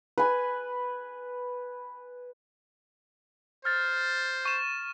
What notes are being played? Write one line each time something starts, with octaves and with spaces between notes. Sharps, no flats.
B4 G#5
C5 F6 A6
C#6 E7